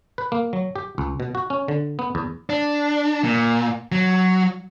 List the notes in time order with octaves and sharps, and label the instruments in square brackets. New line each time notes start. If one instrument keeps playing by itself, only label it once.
[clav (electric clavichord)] B4
A#3
F#3
G4
C#2
B2
F#4
C#4
D3
B3
E2
[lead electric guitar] D4
A#2
F#3